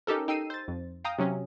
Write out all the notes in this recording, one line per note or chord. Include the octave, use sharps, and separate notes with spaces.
C#4 D#4 G4 A4 A#4
D#4 G5 E6 C7 D#7
C5 A6
F2
F5 G5 A#5 D#6
C3 F#3 C#4